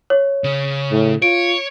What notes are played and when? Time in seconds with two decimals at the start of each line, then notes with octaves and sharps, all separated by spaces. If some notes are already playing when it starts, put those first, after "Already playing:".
0.10 C#5
0.44 C#3
0.91 A2
1.22 F4 C#5 D7